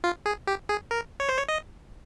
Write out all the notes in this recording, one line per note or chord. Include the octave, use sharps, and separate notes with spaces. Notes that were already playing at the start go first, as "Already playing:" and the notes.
F4
G#4
G4
G#4
A#4
C#5
C5
C#5
D#5